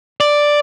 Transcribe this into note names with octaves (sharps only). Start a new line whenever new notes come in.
D5